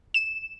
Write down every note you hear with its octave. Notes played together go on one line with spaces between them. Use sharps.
E7